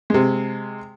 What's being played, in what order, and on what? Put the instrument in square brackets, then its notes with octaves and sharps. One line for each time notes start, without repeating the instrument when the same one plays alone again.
[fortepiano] C3 G#3